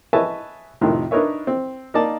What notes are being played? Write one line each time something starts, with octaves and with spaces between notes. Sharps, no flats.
B4 C#5 D#5 E5 G#5 A5
F2 A2 C3 D#3
D4 D#4 A#4 B4 C#5 E5
C4
A#3 D#4 D5 D#5 A5